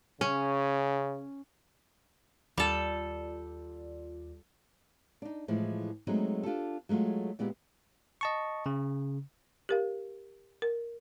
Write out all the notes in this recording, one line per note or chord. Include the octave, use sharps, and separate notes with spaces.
C#3 C#4
D#2 G3 F4 A4 D5
D4 D#4
A2 E3 F3 G#3
F#3 G#3 A3 B3 C4 D#4
D4 F4 G4 A4
F#3 G#3 A3 F4 F#4
A#2 G#3 B3 E4 G4
D#5 A5 C#6
C#3
G4 A#4 F5
A#4